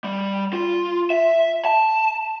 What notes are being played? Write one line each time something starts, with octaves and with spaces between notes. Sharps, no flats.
G3
F4
E5
A5